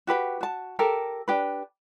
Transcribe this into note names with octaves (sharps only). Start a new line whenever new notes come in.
F#4 G4 B4 G5
F#4 A5
G4 A4 A#4
D4 G4 B4